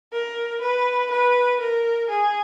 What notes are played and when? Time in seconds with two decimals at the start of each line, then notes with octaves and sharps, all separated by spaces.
0.13 A#4
0.61 B4
1.11 B4
1.60 A#4
2.10 G#4